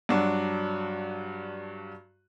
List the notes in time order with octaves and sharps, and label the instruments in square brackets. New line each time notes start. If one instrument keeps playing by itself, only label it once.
[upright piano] G2 F#3 D4 F#4